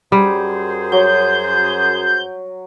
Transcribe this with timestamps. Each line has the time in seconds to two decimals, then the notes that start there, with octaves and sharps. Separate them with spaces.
0.12 F#2 G3 G#4 C5
0.92 F#3 G6